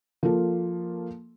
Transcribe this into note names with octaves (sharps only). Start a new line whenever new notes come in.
F3 A#3 F4 A4